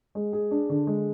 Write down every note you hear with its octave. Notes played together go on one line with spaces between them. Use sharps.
G#3
G#4
D4
D3
G#3